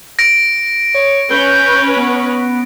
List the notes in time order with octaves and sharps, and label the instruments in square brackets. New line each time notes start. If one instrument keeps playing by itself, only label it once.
[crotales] A#6 D7
[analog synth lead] C#5
[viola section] C#4 B4 [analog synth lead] G6
[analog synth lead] B3